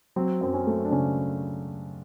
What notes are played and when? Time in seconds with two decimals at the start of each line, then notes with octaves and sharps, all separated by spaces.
0.16 F#3 C4
0.41 F#2 C4
0.54 C#4
0.67 A3
0.85 D4
0.91 C#3 C#4